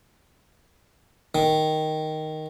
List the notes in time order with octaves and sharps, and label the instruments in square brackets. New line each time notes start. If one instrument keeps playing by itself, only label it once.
[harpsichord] D#3